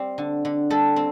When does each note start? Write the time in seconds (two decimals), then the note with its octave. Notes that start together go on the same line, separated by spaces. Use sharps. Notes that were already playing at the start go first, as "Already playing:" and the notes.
Already playing: G3 C4 G4
0.18 D3
0.45 D3
0.70 G3 A4
0.96 C4